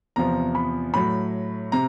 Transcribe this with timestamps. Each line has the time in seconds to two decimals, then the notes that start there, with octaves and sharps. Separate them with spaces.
0.16 E2 C3 F3 A#5
0.55 B5
0.94 A2 F#3 B5
1.72 C3 A#5